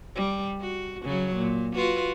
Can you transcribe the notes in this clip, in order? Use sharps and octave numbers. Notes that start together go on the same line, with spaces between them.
G3
F#4
C#3 F#3
A#2
F4 F#4 B4